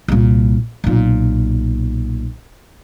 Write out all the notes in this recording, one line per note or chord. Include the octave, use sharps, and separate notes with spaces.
C2 A#2
B1 A#2